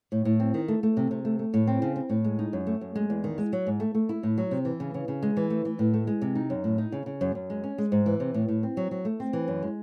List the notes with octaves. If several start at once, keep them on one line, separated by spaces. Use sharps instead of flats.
A2
A2
C4
D#3
A3
A3
C3
C3
A3
A3
A2
C4
C#3
C4
A2
G#3
D#4
F#2
A3
F#2
G#3
E2
D#3
G#3
F#3
G#2
A3
A3
E4
A2
F#3
C3
E3
C#3
C#3
C#3
G#3
E3
A3
E3
A2
A3
G#3
C3
D#4
F#2
A2
D#4
C#3
C#3
F#2
F#2
G#3
C#4
G#3
G#2
E3
C3
A2
A2
C4
F#3
F#3
A3
C4
E3
F#2
G#3